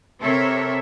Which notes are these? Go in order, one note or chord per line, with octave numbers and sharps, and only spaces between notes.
C3 C4 A4 A#4 C#5 E5